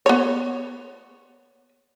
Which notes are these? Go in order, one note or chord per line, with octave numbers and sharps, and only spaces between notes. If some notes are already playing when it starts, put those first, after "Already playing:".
B3 C#5